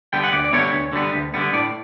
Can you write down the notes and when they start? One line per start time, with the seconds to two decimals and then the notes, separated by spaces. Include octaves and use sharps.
0.13 D3 G3 B3 G5
0.24 F#5
0.33 D2 D5
0.45 D5
0.53 D3 G3 B3 C#5
0.73 D2
0.93 D3 G3 B3
1.14 D2
1.34 D3 G3 B3
1.53 A2 D5